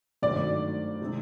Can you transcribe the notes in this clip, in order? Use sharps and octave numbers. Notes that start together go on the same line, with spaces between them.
G#1 G2 D#3 F#3 A3 D5
C3 D#3 G#3 C4